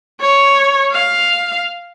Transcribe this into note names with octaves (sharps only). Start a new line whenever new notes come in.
C#5
F5